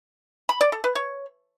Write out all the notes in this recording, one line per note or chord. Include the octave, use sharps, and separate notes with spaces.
B5
D5
A4
B4
C#5